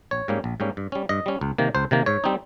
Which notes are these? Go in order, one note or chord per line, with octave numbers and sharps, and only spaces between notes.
A#1 C#5
G#2 G3 A#3 C#4
A#1
G#2 G3 A#3 C#4
G2
G3 C#4
G2 D#5
G3 C#4
C#2
C3 D#3 A#3
C#2 C5
C3 D#3 A#3
G#2 C#5
G3 C4 D#4